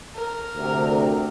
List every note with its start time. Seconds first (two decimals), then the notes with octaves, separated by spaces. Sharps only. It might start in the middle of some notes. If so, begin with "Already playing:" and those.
0.15 A#4
0.56 D2 C3